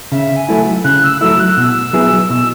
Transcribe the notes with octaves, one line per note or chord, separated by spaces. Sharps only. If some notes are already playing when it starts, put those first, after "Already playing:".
C#3 E5
G#5
F#3 A3 E4
C#3 F#6
E6
F#3 A3 E4 E6
F#6
B2 E6
F#3 B3 E4 G#4
B2 E6